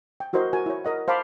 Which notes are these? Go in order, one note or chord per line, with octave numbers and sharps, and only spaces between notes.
G5
E4 F#4 A#4 C5 D#5
F#4 A#4 G#5
E4 C#5
A#4 D#5 F#5
C5 F5 A5 B5 D6